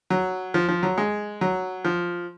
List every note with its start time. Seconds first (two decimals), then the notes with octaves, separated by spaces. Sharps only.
0.10 F#3
0.54 F3
0.68 F3
0.83 F#3
0.98 G#3
1.41 F#3
1.85 F3